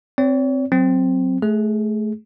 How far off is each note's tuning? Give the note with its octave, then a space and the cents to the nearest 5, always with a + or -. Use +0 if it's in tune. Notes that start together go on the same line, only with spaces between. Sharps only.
C4 +0 C#5 +40
F#3 +0 C4 +0
A3 -25 G#4 +0